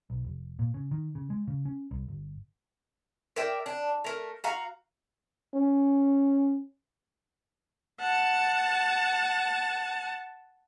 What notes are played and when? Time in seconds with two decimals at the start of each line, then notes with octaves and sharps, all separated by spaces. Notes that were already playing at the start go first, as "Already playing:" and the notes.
0.10 B1
0.25 F1
0.59 A#2
0.74 C#3
0.91 D#3
1.15 C#3
1.30 G#3
1.47 C#3
1.65 C#4
1.91 C2
2.08 G1
3.36 A#4 D5 E5 G5
3.66 D4
4.04 A3 A#4
4.44 F#4 F5 A#5
5.54 C#4
8.00 F#5 A5